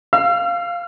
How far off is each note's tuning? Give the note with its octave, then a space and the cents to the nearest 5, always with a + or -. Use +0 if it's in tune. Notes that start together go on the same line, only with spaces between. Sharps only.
F5 +0 E6 +45